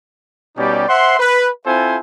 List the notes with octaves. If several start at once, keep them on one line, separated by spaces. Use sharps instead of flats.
B2 G3 C#4 D#4 G4 D5
C5 E5 F#5 C6
B4
C4 E4 F4 A4 C5 G#5